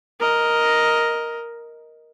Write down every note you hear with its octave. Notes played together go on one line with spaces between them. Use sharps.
A#4 D#5